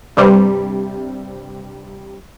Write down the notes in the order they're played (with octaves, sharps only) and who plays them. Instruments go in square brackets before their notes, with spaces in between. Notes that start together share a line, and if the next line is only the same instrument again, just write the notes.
[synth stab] G2 C3 G3